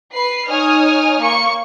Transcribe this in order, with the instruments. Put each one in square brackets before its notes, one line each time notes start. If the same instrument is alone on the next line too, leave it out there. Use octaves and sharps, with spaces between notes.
[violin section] B4 C7
D#4 C#5 G#5 D#6 F6
A#3 C#6 C#7